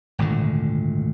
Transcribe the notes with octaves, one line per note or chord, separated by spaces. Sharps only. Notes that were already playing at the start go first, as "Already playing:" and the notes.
G#1 D2 A#2 D3